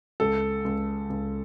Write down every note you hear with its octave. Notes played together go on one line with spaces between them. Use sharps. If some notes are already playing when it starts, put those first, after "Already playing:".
C#2 A4
C#2
C#2